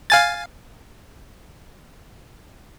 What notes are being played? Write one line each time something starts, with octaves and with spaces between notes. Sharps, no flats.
F5 G#5 A6